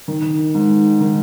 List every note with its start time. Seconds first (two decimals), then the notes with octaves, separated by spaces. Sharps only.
0.08 D#3
0.55 G#2
1.01 D#3